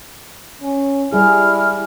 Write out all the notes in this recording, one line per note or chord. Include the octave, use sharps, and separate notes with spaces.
C#4
G3 E4 G#4 F6